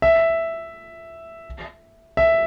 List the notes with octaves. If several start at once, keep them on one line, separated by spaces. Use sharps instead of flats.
E5
E5